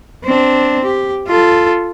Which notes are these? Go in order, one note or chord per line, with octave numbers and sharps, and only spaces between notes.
C4 D4
G4
F4 A4